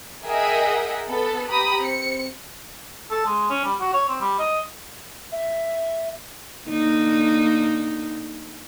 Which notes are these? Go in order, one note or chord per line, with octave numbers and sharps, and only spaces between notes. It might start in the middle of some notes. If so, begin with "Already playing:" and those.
G#4 A#4 D#5 E5 F#5 G5
B3 A4
G4 A#5 B5 D#6
C4 C#7
A4
G#3
C#4
G3
F#4
C#5
C4
G3
D#5
E5
D3 A#3 D#4